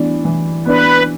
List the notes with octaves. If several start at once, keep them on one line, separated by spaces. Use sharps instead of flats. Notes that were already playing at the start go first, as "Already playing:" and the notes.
Already playing: E3 B3 D4
E3
B3 D4 B4